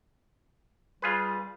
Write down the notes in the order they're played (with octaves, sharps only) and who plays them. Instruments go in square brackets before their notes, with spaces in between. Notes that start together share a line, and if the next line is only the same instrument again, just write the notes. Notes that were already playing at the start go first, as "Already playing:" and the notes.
[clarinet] G3 [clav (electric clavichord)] F4 G#4 B4